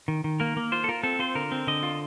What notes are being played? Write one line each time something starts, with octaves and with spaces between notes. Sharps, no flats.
D#3
D#3
A#3 A#4
A#3
F4 C5
A4
F4 A#4
C4 A4
F4 C5
D3 A#4
C4
D3 D#5
F4